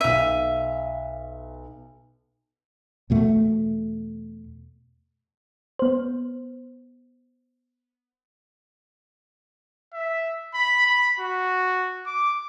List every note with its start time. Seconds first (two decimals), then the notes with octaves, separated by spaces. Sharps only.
0.01 B1 E5 F5 D#7
3.10 E2 B2 A3
5.79 B3 C5
9.93 E5
10.54 B5
10.87 B5
11.20 F#4
12.06 D6